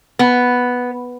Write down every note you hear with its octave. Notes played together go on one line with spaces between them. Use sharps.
B3